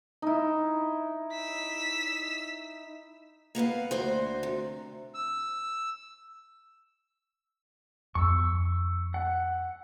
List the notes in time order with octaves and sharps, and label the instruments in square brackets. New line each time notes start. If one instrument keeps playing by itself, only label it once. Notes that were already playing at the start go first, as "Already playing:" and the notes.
[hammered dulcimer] D#4 E4
[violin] E6 B6
[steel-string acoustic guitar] A#3 B3 B4 F5
D2 F#4 C5
C3
[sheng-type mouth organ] E6
[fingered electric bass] F2 B3 [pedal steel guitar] C#6 E6
[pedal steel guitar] F#5